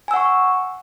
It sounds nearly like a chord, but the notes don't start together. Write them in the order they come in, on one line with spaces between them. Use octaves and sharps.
G#5 E6 F#5 C#6